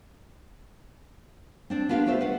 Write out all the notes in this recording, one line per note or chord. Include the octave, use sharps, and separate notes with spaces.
C4 D4 D5
B3 D4 F4 G4 A#4
A3 F4 G4 C5 E5
B4 F5 F#5